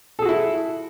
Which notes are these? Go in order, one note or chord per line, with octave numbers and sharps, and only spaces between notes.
E4 F#4 G#4 A4